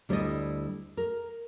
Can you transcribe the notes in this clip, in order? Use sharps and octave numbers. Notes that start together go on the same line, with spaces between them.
D2 G3 E4 C5 D5 D#5
A#4